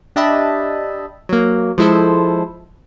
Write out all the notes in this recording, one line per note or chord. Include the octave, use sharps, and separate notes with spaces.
D4 G4 D#5 E5 A5 B5
F#3 A#3
F3 G#3 E4 A4 C5